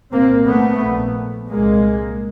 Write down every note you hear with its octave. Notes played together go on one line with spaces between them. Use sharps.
C2 A#2 A#3 C4
A3 B3
A#1 A#2
C2 A#2 G#3 A#3